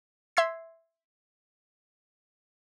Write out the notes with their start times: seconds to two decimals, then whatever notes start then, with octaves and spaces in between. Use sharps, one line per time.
0.37 E5 C6 E6 G#6 C7